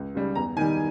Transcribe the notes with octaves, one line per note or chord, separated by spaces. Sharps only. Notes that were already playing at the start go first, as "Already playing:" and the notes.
Already playing: C#2
C#3 G3
E2 A#5
D#3 G3 G#5